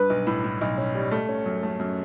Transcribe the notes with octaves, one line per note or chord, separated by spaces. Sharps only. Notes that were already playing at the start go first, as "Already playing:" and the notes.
Already playing: G2 B4
B1
A2
A2
B1
C#4
G3
A3
C#4
F#2
A3
F#2